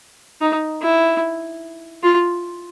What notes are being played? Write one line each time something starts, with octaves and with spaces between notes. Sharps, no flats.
D#4
E4
F4